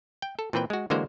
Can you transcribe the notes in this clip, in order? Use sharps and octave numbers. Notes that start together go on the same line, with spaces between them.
G5
A4
A#2 E3 C4 B4 G5
G#3 F#4
D3 E3 G#3 A#3 F#4 C5